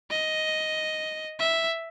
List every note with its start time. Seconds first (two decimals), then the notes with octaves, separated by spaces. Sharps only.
0.10 D#5
1.39 E5